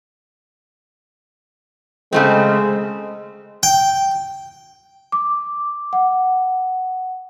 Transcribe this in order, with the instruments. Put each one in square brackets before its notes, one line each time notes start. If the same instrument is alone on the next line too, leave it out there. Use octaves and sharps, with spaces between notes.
[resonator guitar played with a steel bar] C#3 A3 C4 [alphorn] G#3
[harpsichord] G5
[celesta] D6
F#5